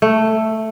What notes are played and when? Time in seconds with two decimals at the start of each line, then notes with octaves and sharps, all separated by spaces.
0.02 A3